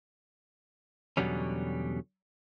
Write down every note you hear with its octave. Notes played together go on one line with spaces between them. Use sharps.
E2 B2 D3 F#3 G3 C#4